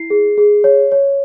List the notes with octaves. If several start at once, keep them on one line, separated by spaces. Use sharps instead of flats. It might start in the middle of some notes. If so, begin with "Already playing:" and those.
Already playing: E4 C7
G#4
G#4
C#5
C#5